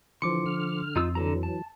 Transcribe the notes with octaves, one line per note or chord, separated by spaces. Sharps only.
D3 E3 F3 C6 D6 C#7
D3 F6
F2 D#4 F4 E6
D3 E3 F#3 A4 A#5
A5